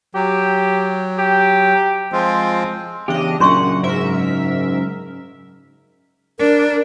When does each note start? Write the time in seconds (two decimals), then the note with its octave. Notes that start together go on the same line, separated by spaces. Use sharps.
0.14 F#3 G4
1.18 G4
2.13 F3 G#3 C4 F4
3.08 E2 C#3 D4 G4 D#5
3.40 F#2 A#2 C#3 D4 F#5 C6 C#6
3.83 G#2 A#4 E5
6.39 D4 A#4